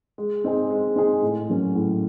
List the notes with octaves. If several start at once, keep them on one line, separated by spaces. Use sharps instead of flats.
G#3
C4 D#4 G#4
G#3
C4 D#4 G#4
A2
F#3 A#3 C#4
A2